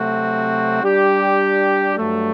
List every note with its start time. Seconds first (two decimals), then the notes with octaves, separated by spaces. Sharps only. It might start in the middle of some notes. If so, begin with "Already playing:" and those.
Already playing: C3 F#3 A3 C4 F#4
0.82 G3 D4 G4
1.97 G2 F#3 A3